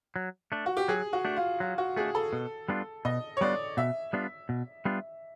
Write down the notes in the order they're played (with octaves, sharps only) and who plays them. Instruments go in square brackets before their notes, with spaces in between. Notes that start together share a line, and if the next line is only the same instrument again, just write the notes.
[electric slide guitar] F#3
A3 D4
[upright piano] F#4
G4
[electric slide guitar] F#3 [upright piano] G#4
[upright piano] F#4
[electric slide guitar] A3 D4
[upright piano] F4
[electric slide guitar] F#3 [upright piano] F4
[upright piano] F#4
[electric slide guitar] A3 D4 [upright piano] G#4
[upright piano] A4
[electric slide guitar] B2
G3 B3 D4 F4
[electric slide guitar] B2 [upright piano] D#5
[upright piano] C#5
[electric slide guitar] G3 B3 D4 F4 [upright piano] D5
[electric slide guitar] B2 [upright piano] E5
[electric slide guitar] G3 B3 D4 F4
B2
G3 B3 D4 F4